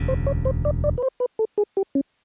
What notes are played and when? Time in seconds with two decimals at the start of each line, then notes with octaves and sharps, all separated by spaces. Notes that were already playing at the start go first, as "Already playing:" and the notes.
Already playing: E1 D2 C#3
0.08 C5
0.27 C#5
0.45 C5
0.65 D5
0.84 D5
0.98 B4
1.02 C5
1.20 B4
1.39 A4
1.58 G#4
1.77 G4
1.95 C#4